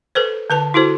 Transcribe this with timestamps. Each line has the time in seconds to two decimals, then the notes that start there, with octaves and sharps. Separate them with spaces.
0.15 A4 B4 C5
0.50 D3 B4 A5
0.74 E4 F#4 A4 C5